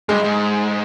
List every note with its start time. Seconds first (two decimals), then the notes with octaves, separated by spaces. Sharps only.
0.09 G2 G#3
0.24 G#2